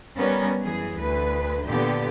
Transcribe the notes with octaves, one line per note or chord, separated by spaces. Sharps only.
G3 B3 C#4 A#4
F#2 E3 G#4
D2 B4
A#2 D3 B3 G4